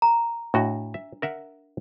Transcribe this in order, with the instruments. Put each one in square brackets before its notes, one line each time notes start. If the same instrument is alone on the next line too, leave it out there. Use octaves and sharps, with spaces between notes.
[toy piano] A#5
[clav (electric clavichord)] A2 F#4 D#5 [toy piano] D4
[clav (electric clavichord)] E5
A#4 E5 F#5